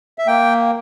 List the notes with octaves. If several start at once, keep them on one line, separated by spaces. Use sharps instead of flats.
E5
A#3 G5